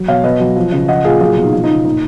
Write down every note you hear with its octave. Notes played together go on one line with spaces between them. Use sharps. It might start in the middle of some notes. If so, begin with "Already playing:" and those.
Already playing: F#3
B2 C#5 F5
B2 B4 D#5
F#3
F3
C#3
F3 D#5 F#5
A#2 F4 G#4
F#3 F4 G#4
B2
D#4
F3 F4
D#4
C#3
A#2 D#4